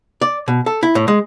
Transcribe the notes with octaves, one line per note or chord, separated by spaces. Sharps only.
D5
B2
A4
E4
A2
G#3